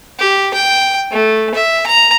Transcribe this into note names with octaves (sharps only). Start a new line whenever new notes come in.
G4
G5
A3
E5
A#5